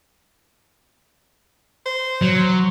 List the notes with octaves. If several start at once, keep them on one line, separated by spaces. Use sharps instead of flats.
C5
F#3